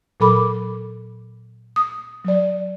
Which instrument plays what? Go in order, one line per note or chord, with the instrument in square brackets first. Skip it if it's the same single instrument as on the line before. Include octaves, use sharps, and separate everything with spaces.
[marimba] A#2 F#3 A4 A#4 B5 D6
D#6
F#3 D5